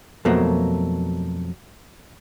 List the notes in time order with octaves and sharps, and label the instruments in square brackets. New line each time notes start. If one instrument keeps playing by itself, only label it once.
[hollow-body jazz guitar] F2 B2 F#3 A3 A#3